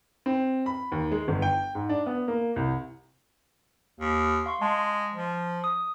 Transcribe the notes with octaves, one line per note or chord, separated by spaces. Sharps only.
C4
B5
D#2
G#3
G1
G5
G#2
D4
B3
A#3
C2
D#2
F5 C6 C#6
G#3 A5
F3
D#6